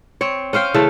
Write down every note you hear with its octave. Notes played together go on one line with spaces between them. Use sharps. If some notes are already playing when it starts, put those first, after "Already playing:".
C4 C#5
C#4 C5 F5 G5
C#3 E3 A3 A4